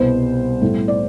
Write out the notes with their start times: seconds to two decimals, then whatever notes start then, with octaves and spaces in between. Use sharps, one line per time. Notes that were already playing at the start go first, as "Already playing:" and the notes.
Already playing: C2 B2 G3 B3 C5
0.62 A2 G3 B3
0.88 D5